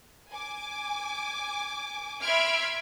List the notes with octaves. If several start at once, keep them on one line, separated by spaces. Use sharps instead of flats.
G#5 D6
E5 B5 C6 F6 G#6 D7